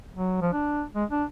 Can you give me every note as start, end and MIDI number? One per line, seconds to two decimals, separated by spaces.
0.14 0.40 54
0.41 0.51 53
0.53 0.84 62
0.95 1.04 56
1.10 1.24 62